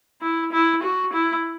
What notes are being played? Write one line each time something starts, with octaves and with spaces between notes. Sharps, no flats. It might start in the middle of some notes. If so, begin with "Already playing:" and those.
E4
E4
F#4
E4